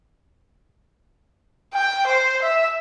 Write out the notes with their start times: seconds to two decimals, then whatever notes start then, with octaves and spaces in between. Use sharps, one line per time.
1.74 G5
2.07 C5
2.42 E5